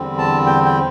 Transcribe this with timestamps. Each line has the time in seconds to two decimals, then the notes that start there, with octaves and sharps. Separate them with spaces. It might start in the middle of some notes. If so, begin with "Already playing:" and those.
Already playing: E2 D3 G3 C4
0.19 A5
0.46 G5
0.65 G5